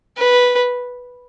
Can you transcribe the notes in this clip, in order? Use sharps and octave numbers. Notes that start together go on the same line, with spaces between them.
B4